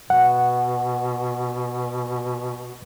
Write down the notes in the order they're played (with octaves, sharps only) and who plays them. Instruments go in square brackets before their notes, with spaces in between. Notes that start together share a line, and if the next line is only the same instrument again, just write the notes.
[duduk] B2 [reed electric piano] F#5